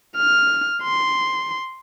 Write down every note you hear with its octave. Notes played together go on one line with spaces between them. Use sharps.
F6
C6